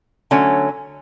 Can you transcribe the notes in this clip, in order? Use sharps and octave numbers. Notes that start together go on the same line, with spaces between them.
D3 F#3 A3 C#4